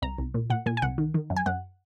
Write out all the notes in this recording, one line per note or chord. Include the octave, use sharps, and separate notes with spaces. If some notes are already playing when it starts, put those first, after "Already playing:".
C2 A#5
C2
A#2
A#2 F#5
A#2 G#5
G#5
C2 F#5
D#3
D#3
F#2
G#5
F#2 F#5